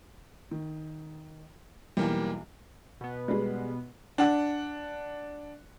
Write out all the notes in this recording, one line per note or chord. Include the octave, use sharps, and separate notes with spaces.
D#3
B1 E2 E3 G3 A#3
B2 B3
G3 G#3
D4 F#5